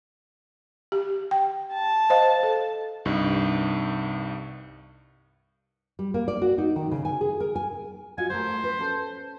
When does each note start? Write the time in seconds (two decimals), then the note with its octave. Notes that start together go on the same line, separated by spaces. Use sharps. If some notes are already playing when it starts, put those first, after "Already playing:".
0.92 G4
1.31 G5
1.74 A5
2.10 C5 D#5 F5
2.43 A4
3.05 C2 G2 D#4
5.99 G3
6.14 A#3
6.28 D5
6.42 F#4
6.58 D#4
6.76 D#3
6.92 C#3
7.05 G#5
7.21 G#4
7.40 A#4
7.56 G#5
8.18 F4 F#4 D#5 G#5
8.30 G#3 A3 A#4 C5
8.64 B4
8.79 C#4 A4